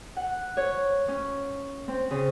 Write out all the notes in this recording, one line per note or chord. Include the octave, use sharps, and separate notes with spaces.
F#5
C#5
C#4
C4
C#3